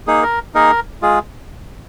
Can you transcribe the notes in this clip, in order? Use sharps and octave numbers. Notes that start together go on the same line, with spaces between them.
A#3 D#4 G#4
A#4
A#3 D#4 G#4 A#4
G#3 F4 G#4